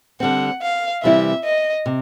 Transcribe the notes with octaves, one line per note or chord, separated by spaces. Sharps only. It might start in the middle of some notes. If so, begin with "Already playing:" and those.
D3 G3 C4 F#5
F5
C3 E3 G3 C4 E4 E5
D#5
C3